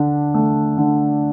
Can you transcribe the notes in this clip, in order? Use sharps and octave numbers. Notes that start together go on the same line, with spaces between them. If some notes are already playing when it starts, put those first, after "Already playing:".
Already playing: D3 D4
A3
D3